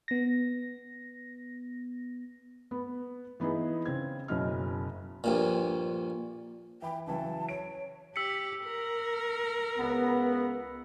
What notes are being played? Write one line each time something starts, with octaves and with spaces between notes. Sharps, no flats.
B3 A#6
B3
E3 B3 D#4 E4 G#4
C#3 C4 G#6
F#1 B2 C#4 D#5 F6
A#1 G2 A#2
E3 G5 B5
C#3 E3 F#3 A5
C#5 D7
G4 E6 B6 C#7
A#4
C#2 B3